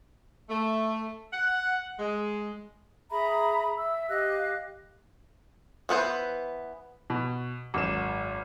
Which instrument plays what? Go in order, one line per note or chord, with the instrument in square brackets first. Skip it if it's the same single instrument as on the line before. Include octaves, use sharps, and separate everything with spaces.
[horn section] A3
F#5
G#3
[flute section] G#4 E5 A#5 B5
E5 E6
G4 D#5 F5 F#6
[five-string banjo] E3 B3 B4 C5
[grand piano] B2
G#1 F#2 A#4 E7